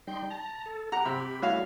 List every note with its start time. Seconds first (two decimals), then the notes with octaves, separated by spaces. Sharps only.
0.07 G3 D#4 G5 C6
0.30 A5 A#5
0.66 A4
0.92 G4 F#5 A#5
1.05 C3 B5
1.42 G3 A3 E4 F#4 C#5 F5